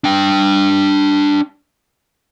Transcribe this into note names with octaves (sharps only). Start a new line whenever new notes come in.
D4 G5